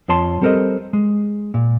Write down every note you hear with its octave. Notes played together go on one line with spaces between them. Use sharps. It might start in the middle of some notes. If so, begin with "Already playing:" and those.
F2 F3 C#5 A5 C6
G3 C4 A4 A#4 C5 D#5
G#3
A#2